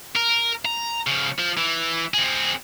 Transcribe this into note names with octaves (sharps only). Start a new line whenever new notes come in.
A#4
A#5
C#3 F3
F3
E3
C4 G#4